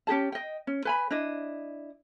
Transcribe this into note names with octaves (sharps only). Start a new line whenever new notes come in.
C#4 G4 G#4 A5
D#5 G5
C#4
B4 G#5 B5
D4 E4 D#5